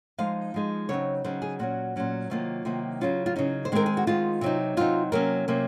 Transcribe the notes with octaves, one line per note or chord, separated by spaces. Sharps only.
F3 G#3 D#4 F5
F3 G#3 D#4
C#3 F#3 C4 D#4 C#5
C#3 F#3 C4 D#4 C5
G#4
A#2 F#3 C#4 F#4
A#2 F#3 C#4
C3 D#3 F#3 A#3 F4
C3 D#3 F#3 A#3
C#3 F#3 C#4 F4
F4
C#3 F#3 C#4 D#4
C5
D#3 G#3 C4 A#4
G#4
F#4
D#3 G#3 C4 F4
C3 F#3 C4 D#4
C3 F#3 C4 D#4 F4
C3 F#3 A#3 C#4 A#4
C3 F#3 A#3 C#4